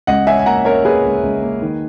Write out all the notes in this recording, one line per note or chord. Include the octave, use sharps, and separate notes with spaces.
C#2 D#5 F#5
C#4 E5 G#5
G#5
A#3 F#5 A#5
C#4 A#4 C#5
A#3 G#4 B4
C#2
C#2
A#3
D#3